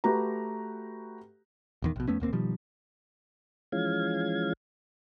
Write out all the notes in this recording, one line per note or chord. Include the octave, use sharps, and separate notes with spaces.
A3 F#4 G4 B4 A#5
D#1 E2 D#3
A#1 B2
F2 A3 B3 C#4
E1 D#2 A#3 C4
B2 D#3 F3 G3
E3 F3 G#3 C#4 F5 G#6